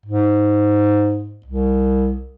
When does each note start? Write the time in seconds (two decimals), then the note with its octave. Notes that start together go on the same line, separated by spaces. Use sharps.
0.05 G#2
1.46 C2